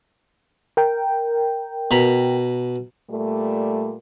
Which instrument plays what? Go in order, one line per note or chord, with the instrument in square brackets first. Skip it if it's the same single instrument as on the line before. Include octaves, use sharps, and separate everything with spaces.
[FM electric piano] A#4 G5
[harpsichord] B2 A#5 B5
[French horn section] A#2 G3 A3